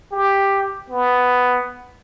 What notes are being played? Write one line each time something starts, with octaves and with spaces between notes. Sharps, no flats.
G4
B3